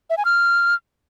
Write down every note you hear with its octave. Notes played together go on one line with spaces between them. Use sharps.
E5
G#5
F6